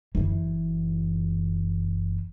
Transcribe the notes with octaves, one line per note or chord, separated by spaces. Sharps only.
F#1 E3